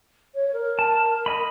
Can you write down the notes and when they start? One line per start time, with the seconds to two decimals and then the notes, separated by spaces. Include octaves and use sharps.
0.35 C#5
0.53 A#4
0.79 A5
1.26 D#5 B5